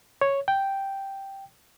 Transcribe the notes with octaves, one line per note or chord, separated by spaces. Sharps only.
C#5
G5